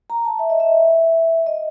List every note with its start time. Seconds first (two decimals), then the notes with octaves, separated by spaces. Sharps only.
0.10 A#5
0.25 A5
0.39 E5
0.50 D#5
0.60 E5
1.46 D#5